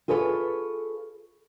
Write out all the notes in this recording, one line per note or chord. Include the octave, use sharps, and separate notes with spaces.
F4 G#4 A4 B4 C#5